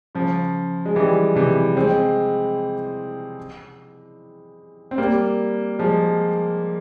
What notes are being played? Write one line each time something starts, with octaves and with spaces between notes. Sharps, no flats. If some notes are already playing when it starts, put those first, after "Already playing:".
C#3 F3
G#3
E3 G3
C3 E3
G#3 C4
C4
G3 A#3
F3 G#3